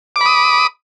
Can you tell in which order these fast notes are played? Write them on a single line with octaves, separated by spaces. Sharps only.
D6 B5 D#6